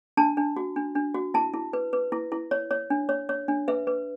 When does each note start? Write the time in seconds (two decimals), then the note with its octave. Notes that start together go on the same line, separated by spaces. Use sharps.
0.17 D4 A5
0.37 D4
0.56 F#4
0.76 D4
0.95 D4
1.15 F#4
1.34 E4 A5
1.54 E4
1.73 B4
1.93 B4
2.12 E4
2.32 E4
2.51 C#5
2.71 C#5
2.90 D4
3.09 C#5
3.29 C#5
3.48 D4
3.68 B4 E5
3.87 B4